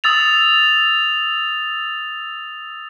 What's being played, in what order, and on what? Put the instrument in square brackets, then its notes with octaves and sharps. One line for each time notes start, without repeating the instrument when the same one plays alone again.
[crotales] D#6 E6 A6 F7